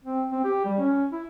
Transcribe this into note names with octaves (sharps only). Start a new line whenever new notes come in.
C4
C4
G4
G3
C#4
E4